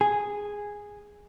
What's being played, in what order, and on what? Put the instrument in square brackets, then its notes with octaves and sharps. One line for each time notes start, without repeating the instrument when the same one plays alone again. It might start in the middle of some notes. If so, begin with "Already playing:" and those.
[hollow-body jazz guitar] G#4